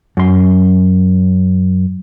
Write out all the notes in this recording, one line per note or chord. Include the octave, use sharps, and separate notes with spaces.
F#2 C6